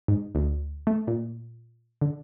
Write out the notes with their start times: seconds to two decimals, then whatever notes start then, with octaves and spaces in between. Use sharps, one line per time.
0.08 G#2
0.35 D2
0.87 A3
1.07 A#2
2.01 D3